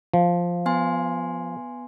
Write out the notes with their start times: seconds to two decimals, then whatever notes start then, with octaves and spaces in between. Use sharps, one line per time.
0.14 F3
0.66 B3 G#5 C6